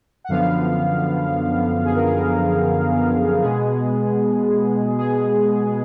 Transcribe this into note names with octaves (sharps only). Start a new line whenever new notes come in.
F#5
F#2 D3 F3 B3 F5
G#4
A#4
G#4
B2 G#3 B3 G#4
G#4